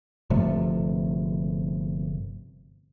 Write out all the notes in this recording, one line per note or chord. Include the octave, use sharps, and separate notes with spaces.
G1 C3 F3 A3